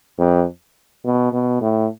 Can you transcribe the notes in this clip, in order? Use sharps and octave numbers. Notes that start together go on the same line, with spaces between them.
F2
B2
B2
A2